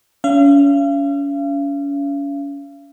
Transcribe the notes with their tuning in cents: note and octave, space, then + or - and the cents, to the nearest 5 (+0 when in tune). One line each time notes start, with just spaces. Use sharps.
C#4 +35 F5 -40